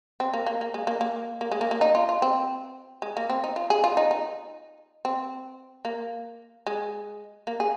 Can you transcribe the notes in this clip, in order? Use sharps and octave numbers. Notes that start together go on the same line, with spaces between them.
C4
A#3
A#3
A#3
G#3
A#3
A#3
A#3
G#3
A#3
A#3
D#4
F4
F4
C4
G#3
A#3
C4
D#4
F4
G#4
F4
D#4
D#4
C4
A#3
G#3
A#3
G#4